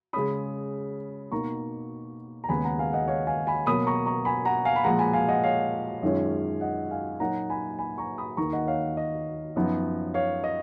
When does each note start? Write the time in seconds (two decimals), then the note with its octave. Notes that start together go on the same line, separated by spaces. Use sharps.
0.13 C#3 G#3 C#4 B5 D#6
1.32 B2 A#3 D#4 A#5 C#6
2.44 A#5
2.49 D#2 C#3 G#3 B3 G#5 B5
2.64 F#5 A#5
2.79 F5 G#5
2.93 D#5 F#5
3.08 C#5 F5
3.27 F5 G#5
3.47 G#5 B5
3.66 B2 F#3 A#3 B5 D#6
3.87 A#5 C#6
4.06 A#5 C#6
4.25 G#5 B5
4.45 F#5 A#5
4.65 F5 G#5
4.76 B5
4.84 A#2 F3 G#3 F#5 A#5
4.99 G#5 B5
5.13 F5 G#5
5.29 D#5 F#5
5.44 C#5 F5
6.03 F#2 D#3 G#3 C#4 F4
6.61 D#5 F#5
6.91 F5 G#5
7.20 A#2 F#3 A#3 D#4 F#5 A#5
7.50 G#5 B5
7.79 G#5 B5
7.98 A#5 C#6
8.18 B5 D#6
8.37 D#2 D#3 A#3 A#5 C#6
8.53 D#5 F#5
8.67 C#5 F5
8.97 D#5
9.56 F#2 F3 B3 D#4
10.14 C#5 F5
10.44 D#5